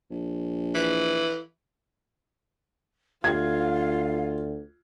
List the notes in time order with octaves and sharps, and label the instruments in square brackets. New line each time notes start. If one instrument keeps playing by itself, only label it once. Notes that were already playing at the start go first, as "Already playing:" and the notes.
[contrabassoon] A#1
[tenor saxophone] E3
[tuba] D2 [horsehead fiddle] F4 [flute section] F5 [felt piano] G#6